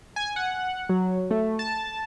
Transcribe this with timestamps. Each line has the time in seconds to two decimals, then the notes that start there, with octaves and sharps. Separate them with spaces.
0.16 G#5
0.36 F#5
0.89 F#3
1.31 A3
1.59 A5